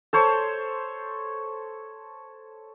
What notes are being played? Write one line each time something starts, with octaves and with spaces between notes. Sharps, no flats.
A4 C5 C#5